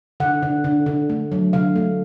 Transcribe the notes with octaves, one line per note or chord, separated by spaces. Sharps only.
D3 F#5
D3
D3
D3
A3
F#3
D3 F5
A3